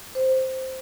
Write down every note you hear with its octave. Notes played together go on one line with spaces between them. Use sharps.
C5